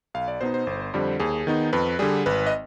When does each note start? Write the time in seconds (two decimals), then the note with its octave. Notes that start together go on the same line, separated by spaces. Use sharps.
0.14 B1 F5
0.28 D5
0.41 B2 B3 D#4 C5
0.54 C5
0.67 G1
0.94 F2 D3 G3
1.20 D#2 G#4
1.47 D#3 B3 D#4
1.73 F2 B4
1.99 D3 G3 G#4
2.26 G#1 B4
2.47 D#5